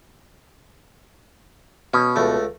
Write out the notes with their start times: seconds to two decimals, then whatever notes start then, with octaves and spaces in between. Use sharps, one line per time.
1.94 B2 C#4
2.16 C#2 A3